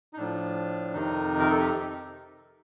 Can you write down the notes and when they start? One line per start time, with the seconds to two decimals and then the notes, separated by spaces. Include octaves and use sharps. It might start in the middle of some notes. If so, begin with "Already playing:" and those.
0.13 D#4
0.17 A2 F3 D4
0.94 F2 C3 D#3 D#4
1.39 A#4
1.50 A4
1.60 G4